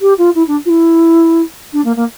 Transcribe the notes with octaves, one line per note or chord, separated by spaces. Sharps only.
G4
F4
E4
D4
F4
E4
D4
A#3
A#3